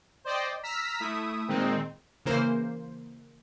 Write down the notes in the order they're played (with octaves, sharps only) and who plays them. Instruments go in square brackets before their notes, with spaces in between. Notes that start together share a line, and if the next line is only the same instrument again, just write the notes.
[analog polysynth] C5 D5 D#5 G5
A#5 E6 F6 B6
A3 E4 E5 D#6
A#2 D#3 G#3 C4 D#4
[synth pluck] C#3 E3 A#3 C5